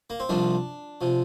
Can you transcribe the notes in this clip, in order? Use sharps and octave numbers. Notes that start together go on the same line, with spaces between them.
A#3
C4
C2 C3 F3 D4
C3 F3